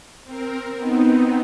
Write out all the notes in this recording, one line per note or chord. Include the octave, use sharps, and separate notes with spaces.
C4 A#4
B3 C4 D#4